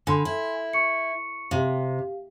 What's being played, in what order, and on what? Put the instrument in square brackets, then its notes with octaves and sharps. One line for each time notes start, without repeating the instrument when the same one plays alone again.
[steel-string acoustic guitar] D3 [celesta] G#5 B5 C6
[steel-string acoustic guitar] E4
[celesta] C#6 C#7
[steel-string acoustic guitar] C3 [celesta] G4 F5